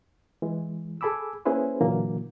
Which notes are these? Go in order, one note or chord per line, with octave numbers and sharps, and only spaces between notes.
E3 G#3
G#4 A4 G#5 B5 D6 E6
A#3 C#4 E4 G#4 B4 C5
A#2 D3 E3 F#3 A#3